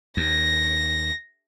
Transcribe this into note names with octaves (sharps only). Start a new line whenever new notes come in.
D#2 A#6